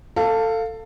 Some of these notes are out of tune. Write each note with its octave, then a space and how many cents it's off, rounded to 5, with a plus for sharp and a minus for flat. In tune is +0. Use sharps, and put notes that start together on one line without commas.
A4 +20 F5 +0